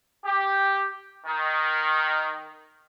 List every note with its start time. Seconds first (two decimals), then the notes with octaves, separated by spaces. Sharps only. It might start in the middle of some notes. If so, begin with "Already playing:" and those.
0.25 G4
1.25 D#3